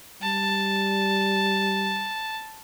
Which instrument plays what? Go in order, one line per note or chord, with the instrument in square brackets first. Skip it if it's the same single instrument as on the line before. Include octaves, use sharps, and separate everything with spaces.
[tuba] G3 [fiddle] A5